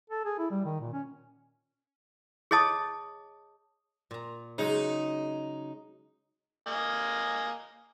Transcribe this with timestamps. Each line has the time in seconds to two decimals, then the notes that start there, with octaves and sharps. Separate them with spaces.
0.10 A4
0.25 G#4
0.38 E4
0.50 G3
0.65 D#3
0.80 A#2
0.93 C#4
2.51 G#4 C#5 D#5 A5 D#6
4.11 A#2 A#5
4.58 C#3 F#3 G#3 D#4
6.67 A#3 D#5 G#5